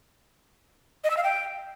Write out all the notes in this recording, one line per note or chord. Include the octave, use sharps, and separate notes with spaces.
D#5
E6
F5
G5